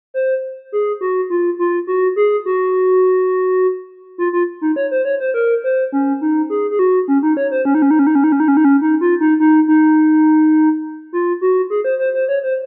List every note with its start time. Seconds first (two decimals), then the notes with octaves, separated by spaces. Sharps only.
0.14 C5
0.72 G#4
1.01 F#4
1.30 F4
1.59 F4
1.87 F#4
2.16 G#4
2.46 F#4
4.18 F4
4.33 F4
4.61 D#4
4.76 C#5
4.91 C5
5.05 C#5
5.20 C5
5.34 A#4
5.64 C5
5.92 C#4
6.21 D#4
6.50 G#4
6.71 G#4
6.79 F#4
7.08 C#4
7.23 D#4
7.37 C#5
7.51 C5
7.65 C#4
7.75 D#4
7.82 C#4
7.91 D#4
7.99 C#4
8.07 D#4
8.15 C#4
8.24 D#4
8.32 C#4
8.40 D#4
8.48 C#4
8.57 D#4
8.65 C#4
8.82 D#4
9.01 F4
9.20 D#4
9.40 D#4
9.68 D#4
11.13 F4
11.41 F#4
11.70 G#4
11.84 C5
11.99 C5
12.14 C5
12.28 C#5
12.43 C5